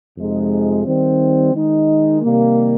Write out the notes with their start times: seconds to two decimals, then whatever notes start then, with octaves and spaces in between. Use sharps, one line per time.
0.17 F2 C3 F3 G#3 D#4
0.85 D#3 G3 C4
1.53 D#3 G#3 D#4
2.22 C3 D#3 G3 A#3